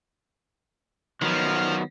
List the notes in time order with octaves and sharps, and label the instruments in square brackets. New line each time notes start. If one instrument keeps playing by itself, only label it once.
[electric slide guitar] D#3 F#3 B3 [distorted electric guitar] F3 [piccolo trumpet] F6